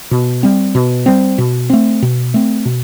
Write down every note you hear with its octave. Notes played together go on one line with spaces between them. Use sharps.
B2
G3 C4
B2
G3 C4
B2
A3 C4
B2
A3 C4
B2